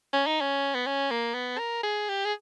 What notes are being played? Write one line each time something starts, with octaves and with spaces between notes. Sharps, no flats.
C#4
D#4
C#4
B3
C#4
A#3
B3
A#4
G#4
G4
G#4